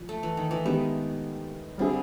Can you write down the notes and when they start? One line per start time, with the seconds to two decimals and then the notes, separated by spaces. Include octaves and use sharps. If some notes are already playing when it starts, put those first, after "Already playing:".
Already playing: F3
0.09 A3
0.23 E3
0.37 D#3
0.51 E3
0.65 D#3 G#3 B3 E4 G4
1.78 D3 G3 C4 E4 G#4